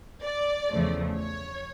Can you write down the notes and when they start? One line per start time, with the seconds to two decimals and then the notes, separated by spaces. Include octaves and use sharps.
0.23 D5
0.70 E2 C#3 F3 A3
1.16 C#5